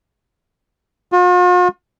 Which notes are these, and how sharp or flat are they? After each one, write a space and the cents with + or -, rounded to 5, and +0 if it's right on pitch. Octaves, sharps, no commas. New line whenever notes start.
F4 +45